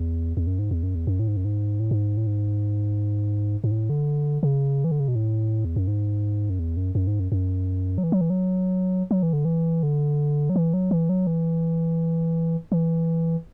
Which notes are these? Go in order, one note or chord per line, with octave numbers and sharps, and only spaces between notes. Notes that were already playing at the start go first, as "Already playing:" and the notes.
Already playing: E2
E2
F#2
G#2
E2
F#2
E2
F#2
A2
G#2
F#2
G#2
A2
G#2
A2
G#2
G#2
A2
D3
C#3
E3
D3
C#3
B2
A2
E2
F#2
G#2
F#2
E2
F#2
F#2
G#2
F#2
F#2
F#3
E3
F#3
E3
F#3
F#3
E3
D3
E3
D3
F#3
E3
F#3
E3
F#3
E3
E3